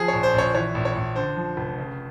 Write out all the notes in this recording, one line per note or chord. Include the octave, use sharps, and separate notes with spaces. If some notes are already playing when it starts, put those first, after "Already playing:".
Already playing: F3 G#4
A#1 C#5
C5
A#1 C#5
E3 C#5
A#1
C#5
A#1
D3 C5
F3
F1
C#3